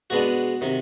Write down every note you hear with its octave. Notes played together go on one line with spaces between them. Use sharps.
B2 G#3 B3 D4 F#4
C3 D#3